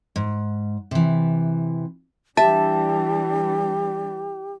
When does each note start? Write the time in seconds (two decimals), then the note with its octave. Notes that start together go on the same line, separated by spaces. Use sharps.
0.16 G#2
0.91 C3 E3
2.37 E3 G3 D4 G4 E5 A5